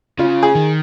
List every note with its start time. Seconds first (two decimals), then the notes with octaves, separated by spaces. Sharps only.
0.19 C#3 F4
0.43 G#4
0.55 D#3